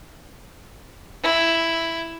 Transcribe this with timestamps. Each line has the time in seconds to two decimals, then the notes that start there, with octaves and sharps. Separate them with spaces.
1.23 E4